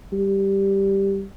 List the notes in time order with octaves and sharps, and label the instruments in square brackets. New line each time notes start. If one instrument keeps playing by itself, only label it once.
[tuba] G3